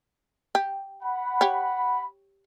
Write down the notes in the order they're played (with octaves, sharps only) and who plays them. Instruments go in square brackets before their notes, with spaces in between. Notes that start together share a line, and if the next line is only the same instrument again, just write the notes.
[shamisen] G4
[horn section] F#5 B5
[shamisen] G4 C#5